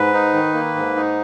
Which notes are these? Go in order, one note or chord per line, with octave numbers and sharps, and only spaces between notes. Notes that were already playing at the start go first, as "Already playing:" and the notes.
Already playing: G#2 B4
D#4
D#3
A#3
G#2
D#4